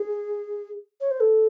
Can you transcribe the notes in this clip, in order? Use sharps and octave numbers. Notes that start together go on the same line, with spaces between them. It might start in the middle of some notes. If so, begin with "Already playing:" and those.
Already playing: G#4
C#5
C5
A4